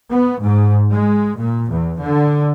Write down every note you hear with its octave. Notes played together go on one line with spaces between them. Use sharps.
B3
G#2
G#3
A#2
E2
D3